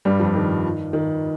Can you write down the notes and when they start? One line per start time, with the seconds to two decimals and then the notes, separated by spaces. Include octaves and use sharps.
0.05 G2 G3
0.20 F2 F3
0.35 D#3
0.93 D#3